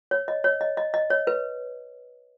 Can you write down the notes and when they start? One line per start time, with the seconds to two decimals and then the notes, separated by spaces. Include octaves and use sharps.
0.11 C#5
0.28 D#5
0.44 C#5
0.61 D#5
0.77 D#5
0.94 D#5
1.10 C#5
1.27 B4